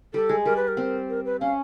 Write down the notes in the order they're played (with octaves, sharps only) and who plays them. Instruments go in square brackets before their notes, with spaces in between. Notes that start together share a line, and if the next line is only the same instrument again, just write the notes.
[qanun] G3 [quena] A4
[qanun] G#3
[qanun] G3 [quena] A#4
[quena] B4
A#4
[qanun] C4
[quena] A#4
B4
[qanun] C#4 [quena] F5